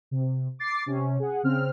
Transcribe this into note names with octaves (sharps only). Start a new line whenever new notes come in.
C3
D6 A6 C7
C3 C#4
G#4 F#5
C#3 C4 F6